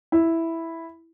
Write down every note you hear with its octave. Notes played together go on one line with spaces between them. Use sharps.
E4